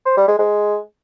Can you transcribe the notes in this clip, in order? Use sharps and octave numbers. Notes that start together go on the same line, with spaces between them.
C5
G3
G#3
G#3